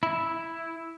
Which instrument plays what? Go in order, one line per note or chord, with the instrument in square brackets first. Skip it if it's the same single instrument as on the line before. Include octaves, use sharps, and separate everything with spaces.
[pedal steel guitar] E4